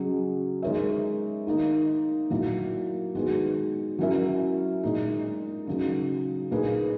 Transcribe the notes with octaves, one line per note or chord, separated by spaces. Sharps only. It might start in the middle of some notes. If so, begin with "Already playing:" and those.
Already playing: C#3 F#3 C#4 G#4 D#5
G#3 D#4 A#4 C#5 E5
D#3 A#3 D#4
A#2 F#3 A#3 E4
D#3 G#3 B3 F#4
F#3 C#4 E4 A#4 E5
A#2 G#3 D#4 G#4
C#3 F#3 A#3 D#4
A#2 A#3 D#4 G#4 B4